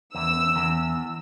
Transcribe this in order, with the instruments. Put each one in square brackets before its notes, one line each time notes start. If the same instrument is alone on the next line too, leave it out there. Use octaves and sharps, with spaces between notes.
[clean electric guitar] E2 [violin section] E6
[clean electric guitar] E2